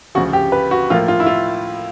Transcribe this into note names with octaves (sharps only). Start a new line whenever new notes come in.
D2 C#3 F3 F#4
G4
B4
F#4
A2 F3 A#3 F4
F4
E4
F4